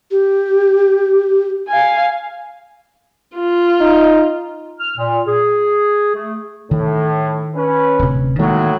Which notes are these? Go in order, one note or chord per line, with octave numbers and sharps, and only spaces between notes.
G4
F5 G#5
F4
D#4
F6
A#2
G#4
A3
A2 D#3
C#4 B4
D1 C3
A2 D#3 F#3 G#3 A#3